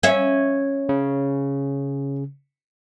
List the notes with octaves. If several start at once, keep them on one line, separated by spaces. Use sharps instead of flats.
C#4 E5
C#3